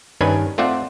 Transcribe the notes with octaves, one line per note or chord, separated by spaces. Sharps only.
G2 D#3 C#4 D4 B4 G#5
A3 C4 F4 D5 E5 F#5